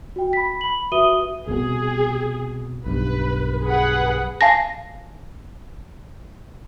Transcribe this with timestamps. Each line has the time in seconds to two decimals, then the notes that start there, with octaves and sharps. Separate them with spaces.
0.16 F#4 G5
0.33 B5 B6
0.61 B5 F#7
0.92 F#4 B4 E5 D#6 D#7 G7
1.47 C2 B2 G#4
2.86 B1 G2 B4
3.64 G#4 B4 F#5
4.41 F5 G#5 A5 A#6